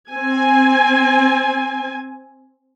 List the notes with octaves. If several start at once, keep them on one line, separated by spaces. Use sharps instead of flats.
C4 G#5